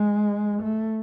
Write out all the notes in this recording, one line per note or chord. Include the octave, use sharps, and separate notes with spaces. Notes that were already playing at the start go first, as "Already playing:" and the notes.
Already playing: G#3
A3